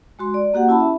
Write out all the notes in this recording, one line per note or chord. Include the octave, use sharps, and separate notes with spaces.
G#3 F#4 C6
D5
A#3 F#4 G4 F#5
C#4 E4 A5 B5
E5